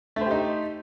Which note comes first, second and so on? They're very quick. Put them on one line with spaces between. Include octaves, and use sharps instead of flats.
A3 C5 G4 D#4